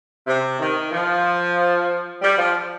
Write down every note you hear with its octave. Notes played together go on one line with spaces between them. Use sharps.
C3
D#3
F3
G3
F3